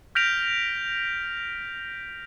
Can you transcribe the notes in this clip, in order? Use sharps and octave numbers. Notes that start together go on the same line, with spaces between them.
F6 G6 A#6 B6 D7 F7